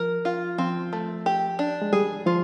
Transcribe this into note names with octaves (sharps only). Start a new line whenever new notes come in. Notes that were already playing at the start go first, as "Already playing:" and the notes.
Already playing: F3 A#4
F4
F3 C4
A3
G4
D4
G#3
G3 G#4
F3 F4